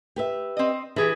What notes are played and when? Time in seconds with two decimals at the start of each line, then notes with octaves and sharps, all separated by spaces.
0.16 G4 B4 E5
0.57 C4 D#5
0.96 E3 G4 G#4 B4